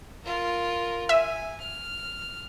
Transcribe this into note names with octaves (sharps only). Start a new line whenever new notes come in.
F4 A#4
E5 G#5
F6